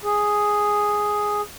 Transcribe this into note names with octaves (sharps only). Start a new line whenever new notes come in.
G#4